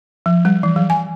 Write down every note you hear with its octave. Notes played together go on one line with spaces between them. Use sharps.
F3
G3
E3
F#3
G#5